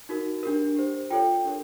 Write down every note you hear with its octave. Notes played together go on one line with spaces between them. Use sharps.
D#4 F#4 A#4
D4 G4 A#4
G4 C5
F4 A4 C#5 G5
D4 G4 A#4 C#5